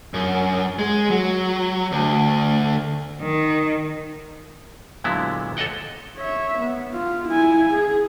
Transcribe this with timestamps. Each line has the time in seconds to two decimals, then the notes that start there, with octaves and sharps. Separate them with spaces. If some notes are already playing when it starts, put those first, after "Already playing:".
0.14 F#2
0.79 G#3
1.10 F#3
1.92 D2
3.22 D#3
5.04 A#2 D3 F#3 G#3 B3 E4
5.57 A4 C#5 D#5 F#5 G5
6.17 C#5 E5
6.58 B3
6.94 F4
7.28 E4 G#5
7.74 G#4